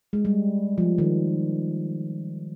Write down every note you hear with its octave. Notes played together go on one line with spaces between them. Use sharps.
G#3
G3
F3
D#3